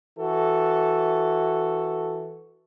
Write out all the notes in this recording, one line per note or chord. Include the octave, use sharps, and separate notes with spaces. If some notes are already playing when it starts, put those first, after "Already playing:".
E3 F#4 A4